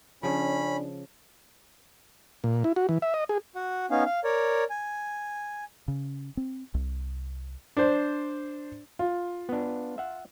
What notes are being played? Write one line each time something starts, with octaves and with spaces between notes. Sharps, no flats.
C#3 F3 C#4 D4 B5
A#2
E4
F#4
E3
E5
D#5
G#4
F#4 F#5
B3 C#4 D#4 F5
F5
A#4 C#5 D5
G#5
C#3
C4
C2
D4 C5
F4
B3 D4
E5 F#5